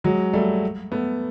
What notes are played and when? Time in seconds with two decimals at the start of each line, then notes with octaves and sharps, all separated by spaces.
0.04 F#3 G#3
0.33 G3 A3
0.92 A3 B3